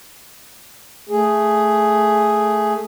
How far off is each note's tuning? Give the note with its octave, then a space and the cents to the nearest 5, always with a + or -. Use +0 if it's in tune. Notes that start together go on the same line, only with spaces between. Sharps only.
A3 +0 G#4 +5